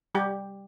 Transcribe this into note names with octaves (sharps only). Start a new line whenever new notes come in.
G3 G4